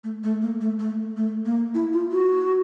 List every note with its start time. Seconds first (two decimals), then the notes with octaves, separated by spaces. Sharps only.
0.04 A3
0.24 A3
0.42 A#3
0.61 A3
0.79 A3
1.17 A3
1.46 A#3
1.74 E4
1.93 F4
2.12 F#4